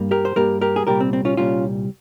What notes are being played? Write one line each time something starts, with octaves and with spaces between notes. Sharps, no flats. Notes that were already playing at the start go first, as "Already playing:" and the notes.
Already playing: G2 G3 A#3
G4 A#4
C5
G2 G3 A#3 G4 A#4
G4 A#4
G#4
C2 A#2 G3 G4 A#4
C4
C4
C#4 F4
C2 A#2 G3 C#4 F4